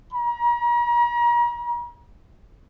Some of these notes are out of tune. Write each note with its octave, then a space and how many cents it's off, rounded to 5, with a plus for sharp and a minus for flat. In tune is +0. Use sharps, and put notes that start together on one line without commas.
A#5 +40